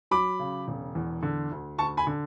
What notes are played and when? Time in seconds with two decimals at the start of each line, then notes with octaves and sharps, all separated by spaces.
0.11 F#3 B5 D6
0.39 C#3
0.68 E1
0.95 E2
1.23 D3
1.51 D2
1.78 D2 A5 C#6
1.97 G#5 B5
2.07 D3